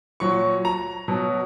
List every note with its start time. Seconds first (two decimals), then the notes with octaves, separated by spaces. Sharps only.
0.20 A#2 F#3 C#6
0.65 A#5
1.08 B2 F#3